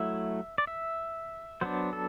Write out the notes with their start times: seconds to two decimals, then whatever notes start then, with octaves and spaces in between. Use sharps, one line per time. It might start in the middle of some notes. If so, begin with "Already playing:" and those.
Already playing: F#3 A3 E4 E5
0.58 D5
0.67 E5
1.61 F#3 B3 D4 C5
1.93 A4